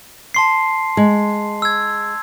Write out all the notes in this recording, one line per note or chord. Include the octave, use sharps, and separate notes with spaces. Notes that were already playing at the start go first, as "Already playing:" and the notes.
A5 C6 C7
G#3
E6 G#6